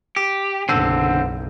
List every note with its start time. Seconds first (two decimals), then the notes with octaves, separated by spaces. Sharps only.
0.16 G4
0.69 F#1 B1 D3 C4